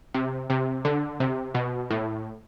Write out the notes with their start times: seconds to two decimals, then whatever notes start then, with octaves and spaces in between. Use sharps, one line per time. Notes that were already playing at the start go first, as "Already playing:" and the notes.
0.14 C3
0.50 C3
0.85 D3
1.20 C3
1.54 B2
1.90 A2